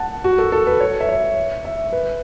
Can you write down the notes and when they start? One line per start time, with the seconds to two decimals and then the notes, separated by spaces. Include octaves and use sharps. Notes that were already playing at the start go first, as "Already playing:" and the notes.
Already playing: F#5 A5
0.24 F#4
0.39 A4
0.52 A4
0.67 B4
0.80 C#5
1.01 E5
1.09 C#5
1.65 E5
1.93 B4